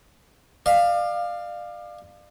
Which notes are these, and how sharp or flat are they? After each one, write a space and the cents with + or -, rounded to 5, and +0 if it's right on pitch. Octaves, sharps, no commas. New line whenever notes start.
D5 +35 F5 +0